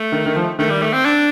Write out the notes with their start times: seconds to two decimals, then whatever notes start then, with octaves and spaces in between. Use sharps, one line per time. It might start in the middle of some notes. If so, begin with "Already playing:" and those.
Already playing: A3
0.12 D#3
0.26 D#3
0.36 F3
0.59 D#3 A3
0.70 G3
0.82 A3
0.93 C4
1.05 D4